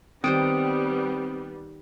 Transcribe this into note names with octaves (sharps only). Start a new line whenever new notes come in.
D#3 G3 B3 C4 D#4 C5 D#6 D7